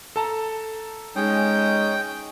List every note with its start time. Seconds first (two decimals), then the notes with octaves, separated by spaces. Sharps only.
0.16 A4 A5 A#5
1.16 G#3 C#4 D#4 C#5 G5 D#6